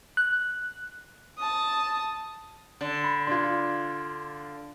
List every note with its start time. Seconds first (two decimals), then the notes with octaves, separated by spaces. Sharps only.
0.17 F#6
1.38 A5 D#6
2.81 D3
3.04 B5
3.27 D4 F4 C6 G#6